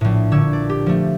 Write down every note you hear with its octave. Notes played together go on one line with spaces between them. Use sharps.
A#1 A2
A#2 D3 C#6 E6 G#6
D5
G4
F3 A3